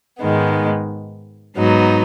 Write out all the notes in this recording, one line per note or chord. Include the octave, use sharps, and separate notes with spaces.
G#2 D#3 G#3 B3
G#2 F#3 B3 D#4